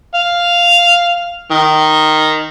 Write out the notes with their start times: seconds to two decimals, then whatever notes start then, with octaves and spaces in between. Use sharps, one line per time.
0.15 F5
1.51 D#3